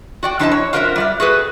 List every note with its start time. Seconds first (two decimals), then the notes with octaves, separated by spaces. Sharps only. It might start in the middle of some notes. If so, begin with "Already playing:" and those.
0.23 F#4 D5 G5
0.39 F3 D4 E4 C5 D#5 A5
0.52 C#5
0.73 F4 F#4 A#4 C5 C#5 E5
0.96 G3 D5 E5
1.20 F#4 G#4 A4 B4